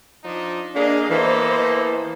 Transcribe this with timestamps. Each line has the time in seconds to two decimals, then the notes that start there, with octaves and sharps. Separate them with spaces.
0.24 F3 D4 D#4
0.75 A#3 D4 G#4 D#5 F5
1.11 E3 A#3 B3 A4 C5 D#5